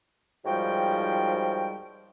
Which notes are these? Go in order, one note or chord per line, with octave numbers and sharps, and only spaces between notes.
D#2 G#2 F3 G3 F#4 G5